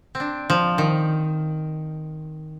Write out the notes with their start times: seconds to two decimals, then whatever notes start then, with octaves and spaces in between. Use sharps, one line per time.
0.15 C4
0.20 D4
0.50 F3
0.78 D#3